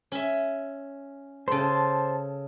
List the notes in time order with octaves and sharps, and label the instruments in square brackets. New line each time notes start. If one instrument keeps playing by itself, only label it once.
[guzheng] C#4 E5
[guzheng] C#3 A4 [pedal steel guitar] C5 A5